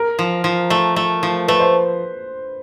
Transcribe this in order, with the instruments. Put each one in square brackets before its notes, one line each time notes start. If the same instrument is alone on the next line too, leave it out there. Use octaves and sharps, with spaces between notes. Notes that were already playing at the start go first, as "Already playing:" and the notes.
Already playing: [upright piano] A#4
[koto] F3
F3
A3
A3
F3
[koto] A3 [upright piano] B4
[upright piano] C5